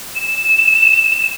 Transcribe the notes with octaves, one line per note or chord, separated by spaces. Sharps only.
E7